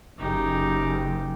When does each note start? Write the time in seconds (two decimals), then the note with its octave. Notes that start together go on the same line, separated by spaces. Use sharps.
0.19 F#1 C#3 D#4 G4